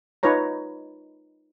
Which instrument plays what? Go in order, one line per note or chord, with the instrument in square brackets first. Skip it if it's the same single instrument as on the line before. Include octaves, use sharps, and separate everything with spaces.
[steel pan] D#4 F4 B4 C#5 A#5